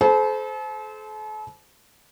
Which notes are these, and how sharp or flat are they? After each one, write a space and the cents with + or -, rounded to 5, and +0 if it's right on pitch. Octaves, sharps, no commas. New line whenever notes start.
A4 -40 C5 -15 A#5 +40